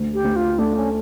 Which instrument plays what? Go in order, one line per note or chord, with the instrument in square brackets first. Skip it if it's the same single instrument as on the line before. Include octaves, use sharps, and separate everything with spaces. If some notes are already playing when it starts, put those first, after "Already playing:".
Already playing: [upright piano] D2
[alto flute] G4
[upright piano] D2
[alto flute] F4
[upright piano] A3 [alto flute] D4
[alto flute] C#4